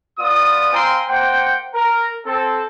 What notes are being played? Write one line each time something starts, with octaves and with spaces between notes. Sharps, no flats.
B3 F4 D5 D#6
C4 F5 G5 G#5 A#5 C6
A#3 C5 F#5 G5
A#4
C4 A4